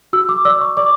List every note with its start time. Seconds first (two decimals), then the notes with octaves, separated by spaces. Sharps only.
0.13 F#4 E6
0.29 D6
0.45 D5 E6
0.61 C#6
0.77 D5 D6